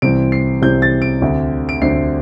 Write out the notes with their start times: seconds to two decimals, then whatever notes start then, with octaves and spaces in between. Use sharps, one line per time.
0.02 C2 C3 E3 C4 D7
0.32 C7
0.62 C2 C3 E3 C4 G6
0.82 A6
1.02 D7
1.21 D2 D3 C4
1.69 D7
1.82 D2 D3 C4 C7